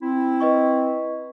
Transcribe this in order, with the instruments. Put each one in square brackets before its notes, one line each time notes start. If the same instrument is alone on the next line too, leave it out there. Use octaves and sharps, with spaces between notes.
[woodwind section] C4 E4
[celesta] B4 D#5 C#6